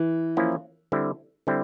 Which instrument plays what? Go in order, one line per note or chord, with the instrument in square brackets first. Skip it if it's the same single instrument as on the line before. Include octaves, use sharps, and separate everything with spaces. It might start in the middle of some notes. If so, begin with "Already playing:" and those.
Already playing: [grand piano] E3
[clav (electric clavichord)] F3 A#3 C#4 E4
D3 G3 C4 E4
D3 G3 C4 E4